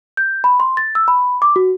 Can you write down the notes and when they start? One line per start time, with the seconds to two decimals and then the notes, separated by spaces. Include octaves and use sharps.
0.17 G6
0.44 B5
0.60 C6
0.77 A6
0.95 E6
1.08 B5
1.42 D6
1.56 F#4